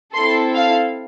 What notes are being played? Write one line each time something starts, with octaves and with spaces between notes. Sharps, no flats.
C4 E4 A4 C6
F5